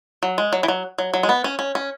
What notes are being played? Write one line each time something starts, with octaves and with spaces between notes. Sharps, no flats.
F#3
G#3
F#3
E3
F#3
F#3
F#3
G#3
B3
C#4
C#4
C#4